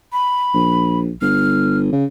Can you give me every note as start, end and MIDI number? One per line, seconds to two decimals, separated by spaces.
0.12 0.98 83
0.54 1.10 34
1.22 1.89 31
1.22 1.78 89
1.92 2.05 49